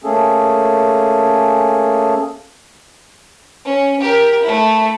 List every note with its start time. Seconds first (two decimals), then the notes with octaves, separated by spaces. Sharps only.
0.04 A3 A#3 C#4 G#4 A4
3.65 C#4
4.00 G4 A#4
4.43 A3 E4